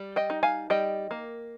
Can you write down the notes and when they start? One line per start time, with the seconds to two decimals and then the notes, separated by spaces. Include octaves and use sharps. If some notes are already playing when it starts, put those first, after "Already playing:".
Already playing: G3
0.16 D#5 G5
0.30 D#4
0.43 F5 G#5
0.70 G3 D#5 G5
1.11 A#3